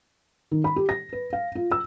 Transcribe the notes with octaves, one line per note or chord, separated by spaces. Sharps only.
D#3
B5
G4
A#6
B4
F5
F4
E6